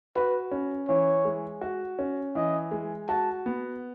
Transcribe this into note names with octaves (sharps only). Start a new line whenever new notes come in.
F#4 B4
C#4
E3 C#5
G#3
F#4
C#4
E3 D#5
G#3
F#4 A5
B3